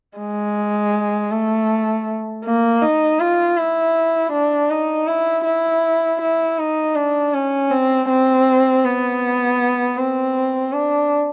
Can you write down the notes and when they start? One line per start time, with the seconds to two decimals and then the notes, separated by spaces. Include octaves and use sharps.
0.18 G#3
1.31 A3
2.45 A#3
2.82 D#4
3.20 F4
3.58 E4
4.32 D4
4.70 D#4
5.07 E4
5.45 E4
6.21 E4
6.59 D#4
6.96 D4
7.34 C#4
7.71 C4
8.09 C4
8.85 B3
9.97 C4
10.73 D4